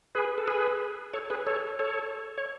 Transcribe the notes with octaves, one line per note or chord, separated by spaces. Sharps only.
G#4 B4
A4
G#4 B4
A4 C#5
G#4 B4
A4 C#5
A4 C#5
C#5